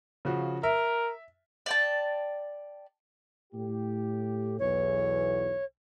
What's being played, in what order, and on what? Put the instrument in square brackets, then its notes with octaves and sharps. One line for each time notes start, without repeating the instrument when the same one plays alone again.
[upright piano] C#3 F3 F#4
[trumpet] A#4 [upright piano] E5
[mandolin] D5 G5 A5
[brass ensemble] A2 G4
[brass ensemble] B1 E2 [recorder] C#5